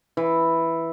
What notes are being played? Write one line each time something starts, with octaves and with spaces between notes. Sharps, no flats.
E3